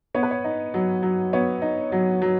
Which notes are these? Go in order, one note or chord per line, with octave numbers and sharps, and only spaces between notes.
B3 C#5
B4
C#5
D#4
F#3
F#3
B3 C#5
D#4
F#3
F#3